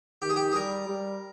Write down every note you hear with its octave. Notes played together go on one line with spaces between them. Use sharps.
D#3 G4
G#4
G4
G#4
G3 A#4
G3